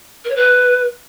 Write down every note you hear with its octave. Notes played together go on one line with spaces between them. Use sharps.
A#4
C#5
B4